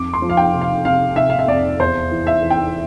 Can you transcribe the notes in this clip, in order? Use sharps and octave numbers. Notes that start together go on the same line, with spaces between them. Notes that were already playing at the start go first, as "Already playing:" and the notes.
Already playing: F2 D6
C6
F3
F5
G5
C3
F5
C3 F5
C3 E5
F5
E5
F2 D5
E2 C5
E3
E5
E3
G5